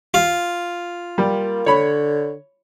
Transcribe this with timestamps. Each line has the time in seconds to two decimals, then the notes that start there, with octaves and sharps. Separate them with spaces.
0.14 F4
1.18 G3 A#3
1.66 D3 C#5 B5